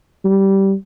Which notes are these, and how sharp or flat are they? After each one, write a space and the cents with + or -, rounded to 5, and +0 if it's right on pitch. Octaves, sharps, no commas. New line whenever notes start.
G3 -15